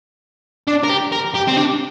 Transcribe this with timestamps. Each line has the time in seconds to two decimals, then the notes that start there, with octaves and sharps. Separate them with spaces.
0.67 D4
0.84 A#4
0.89 G4
1.12 A#4
1.35 G4
1.48 C4
1.57 D4